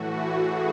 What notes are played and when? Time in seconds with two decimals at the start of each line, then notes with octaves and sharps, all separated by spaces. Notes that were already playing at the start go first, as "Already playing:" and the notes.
Already playing: A2 E3 A3 F#4
0.31 G#4